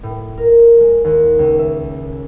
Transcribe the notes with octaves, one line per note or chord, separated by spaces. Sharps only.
A2
A#4
G#3
D#2
C#2
E5